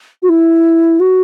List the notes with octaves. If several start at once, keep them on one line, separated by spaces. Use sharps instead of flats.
F#4
E4
F#4